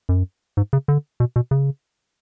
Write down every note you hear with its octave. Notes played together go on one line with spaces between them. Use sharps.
F#2
G#2
C#3
D3
B2
B2
C#3